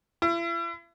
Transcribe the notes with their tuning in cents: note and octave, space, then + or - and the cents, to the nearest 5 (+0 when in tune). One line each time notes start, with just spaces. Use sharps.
E4 +40